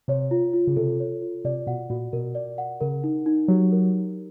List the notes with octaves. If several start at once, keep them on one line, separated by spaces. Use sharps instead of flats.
C3 C#5
F4
F4
C#3
C3 A4
C#5
F4
C3 D5
B2 F#5
A#2 F#4
B2 A#4
D5
F#5
C#3 A#4
D#4
D#4
F#3 G4
A#4
D#4